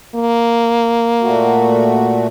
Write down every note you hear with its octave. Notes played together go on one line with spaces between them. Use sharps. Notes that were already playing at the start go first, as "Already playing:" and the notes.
A#3
A#2 A3 F#4